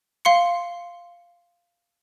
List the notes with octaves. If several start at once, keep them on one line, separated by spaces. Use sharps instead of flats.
F5 C6 C#7